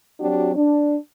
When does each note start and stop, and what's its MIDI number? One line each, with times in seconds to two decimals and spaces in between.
0.20 0.53 54
0.20 0.53 60
0.20 0.53 62
0.20 0.53 66
0.20 0.53 67
0.56 0.97 62